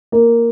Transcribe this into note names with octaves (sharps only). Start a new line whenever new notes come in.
A#3